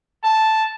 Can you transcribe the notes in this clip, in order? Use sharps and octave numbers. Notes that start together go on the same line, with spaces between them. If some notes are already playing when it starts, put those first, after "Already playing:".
A5